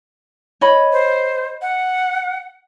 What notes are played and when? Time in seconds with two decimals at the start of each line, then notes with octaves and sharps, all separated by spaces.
0.61 C#5 D#5 B5
0.92 C5
1.62 F#5